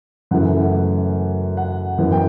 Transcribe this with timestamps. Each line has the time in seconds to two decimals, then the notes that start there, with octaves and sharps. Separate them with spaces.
0.31 F#2 C#3 E3 A3 F#5
1.57 F#5
1.98 F#2 E3 B3
2.12 G5